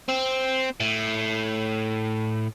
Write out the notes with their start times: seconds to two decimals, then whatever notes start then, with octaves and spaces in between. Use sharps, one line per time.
0.09 C4
0.80 A2